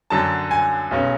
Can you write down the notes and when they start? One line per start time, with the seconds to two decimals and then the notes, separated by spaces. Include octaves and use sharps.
0.10 F#2 D3 F#3 A5
0.51 G#5
0.91 B1 B2 G#3 C#4